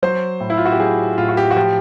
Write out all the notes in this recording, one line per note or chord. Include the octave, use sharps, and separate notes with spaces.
F#3 C5
A2
E4
F4
F#4
G4
F#3 G#4
A2 F4
F#4
G4
F#4
F3 G4